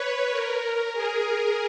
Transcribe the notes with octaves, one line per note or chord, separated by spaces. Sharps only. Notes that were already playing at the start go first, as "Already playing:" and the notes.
Already playing: B4 C#5
A#4
A#4
G#4